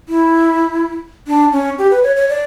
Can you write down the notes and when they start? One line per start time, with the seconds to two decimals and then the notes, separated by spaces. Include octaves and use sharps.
0.09 E4
1.27 D4
1.52 C#4
1.78 G4
1.91 B4
2.03 C#5
2.16 C#5
2.29 D5